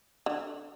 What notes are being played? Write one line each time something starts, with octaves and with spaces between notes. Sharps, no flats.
D3